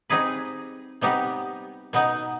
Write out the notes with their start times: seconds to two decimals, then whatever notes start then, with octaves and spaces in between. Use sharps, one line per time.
0.10 G3 C4 D#4 G#4 B4
1.01 C3 G3 B3 D#4 G4
1.93 B2 B3 D#4